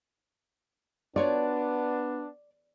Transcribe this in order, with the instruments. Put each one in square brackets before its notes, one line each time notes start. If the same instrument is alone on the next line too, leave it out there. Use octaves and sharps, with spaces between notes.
[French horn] B3 [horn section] D4 [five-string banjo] F4 F#4 C#5 [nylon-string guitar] D5